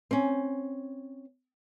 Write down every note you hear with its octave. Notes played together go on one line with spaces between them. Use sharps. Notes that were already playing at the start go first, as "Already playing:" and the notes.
C4 C#4